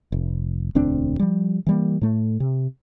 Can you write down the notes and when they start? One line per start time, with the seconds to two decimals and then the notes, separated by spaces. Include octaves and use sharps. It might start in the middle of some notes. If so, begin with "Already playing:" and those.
0.12 F1
0.75 E1 D2 C4 D4
1.19 F3 G3
1.67 E3 G3 A#3
2.01 A2 A3
2.40 C3